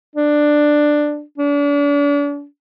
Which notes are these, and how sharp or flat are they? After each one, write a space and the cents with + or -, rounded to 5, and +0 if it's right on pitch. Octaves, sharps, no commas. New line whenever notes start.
D4 +10
D4 -40